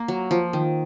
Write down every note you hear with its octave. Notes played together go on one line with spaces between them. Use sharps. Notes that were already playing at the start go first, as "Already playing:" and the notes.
Already playing: A#3
F#3
F3
D#3